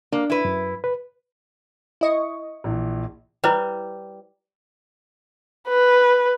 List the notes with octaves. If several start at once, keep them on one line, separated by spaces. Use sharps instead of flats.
A#3 D4
E4 B4
F#2
B4
E4 D#5 C#6
A#1 E3
G3 E4 B4 C5
B4